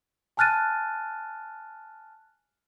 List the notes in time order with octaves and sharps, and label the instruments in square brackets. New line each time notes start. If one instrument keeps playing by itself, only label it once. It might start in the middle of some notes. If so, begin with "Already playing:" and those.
[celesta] G#5 A5 F6 F#6 A6 D#7